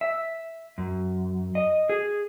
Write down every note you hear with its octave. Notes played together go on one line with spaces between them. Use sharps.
E5
F#2
D#5
G#4